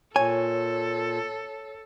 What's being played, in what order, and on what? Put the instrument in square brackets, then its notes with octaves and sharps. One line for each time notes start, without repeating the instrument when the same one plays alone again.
[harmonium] A#2 [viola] A4 [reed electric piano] C#5 [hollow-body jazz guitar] G#5